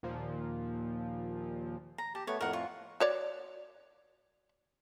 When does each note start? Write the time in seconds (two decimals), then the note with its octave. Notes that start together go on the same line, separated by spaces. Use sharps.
0.03 D#2 A#2 F3
1.98 A#5
2.15 G4 A5
2.27 A3 B3 C#5
2.41 F2 A2 A#4 F#5
2.53 F4 C#6
3.00 F#4 C#5 D5